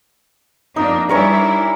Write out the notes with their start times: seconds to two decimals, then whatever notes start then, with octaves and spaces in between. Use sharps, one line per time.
0.76 F2 A#3 D4 D#4
1.09 G3 D4 E4 A#4 C#5 G#5